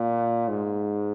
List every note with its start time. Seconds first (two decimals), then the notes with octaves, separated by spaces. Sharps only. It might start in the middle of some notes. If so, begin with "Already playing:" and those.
Already playing: A#2
0.48 G#2